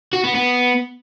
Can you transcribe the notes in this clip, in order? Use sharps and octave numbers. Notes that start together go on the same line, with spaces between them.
F#4
B3
B3